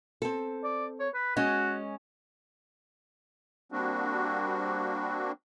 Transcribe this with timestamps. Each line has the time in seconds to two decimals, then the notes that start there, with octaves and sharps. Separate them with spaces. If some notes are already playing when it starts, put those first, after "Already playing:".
0.22 C4 A4
0.64 D5
1.00 C#5
1.14 B4
1.37 G#3 C#4 F#4 D#5
3.72 G3 A#3 C4 D4 F#4